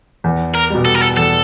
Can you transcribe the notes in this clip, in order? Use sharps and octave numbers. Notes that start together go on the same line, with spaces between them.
E2
A#4
B2 G3
A4
A#4
A4
E2 A4